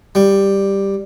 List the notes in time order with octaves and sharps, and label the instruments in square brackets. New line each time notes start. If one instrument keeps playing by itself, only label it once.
[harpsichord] G3